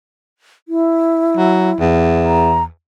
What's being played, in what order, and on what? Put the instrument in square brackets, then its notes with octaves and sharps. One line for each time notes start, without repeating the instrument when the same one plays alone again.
[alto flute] E4
[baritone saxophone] F#3
E2
[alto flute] A#5